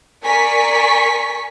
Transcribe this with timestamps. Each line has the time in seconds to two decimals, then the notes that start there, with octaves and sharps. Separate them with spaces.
0.24 A#4 D5 G#5 C#6 B6